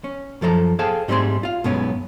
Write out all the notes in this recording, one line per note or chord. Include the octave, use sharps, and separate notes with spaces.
C#4
F#2 F3 A4 C#5 A#5
G#4 A4 C5 F5 G5 A5
G#2 G3 A3 C4 G#4 C6
F4 F5
B1 G2 G#3 B3 C#4 C#5